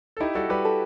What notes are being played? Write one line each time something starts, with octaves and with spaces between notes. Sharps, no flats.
A4
D#4 E4 G4
G3 F#4 A4
G3 G4 B4
A4